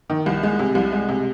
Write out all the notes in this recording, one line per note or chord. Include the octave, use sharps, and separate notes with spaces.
D#3
C2
G#3
C3
C2
G#3
C3